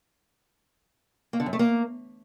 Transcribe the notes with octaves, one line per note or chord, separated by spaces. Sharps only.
A#3
D3
F#2
A3
A#3